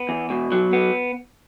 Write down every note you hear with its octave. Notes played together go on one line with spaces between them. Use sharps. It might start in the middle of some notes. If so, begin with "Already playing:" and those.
Already playing: B3
E2
B2
F#3
B3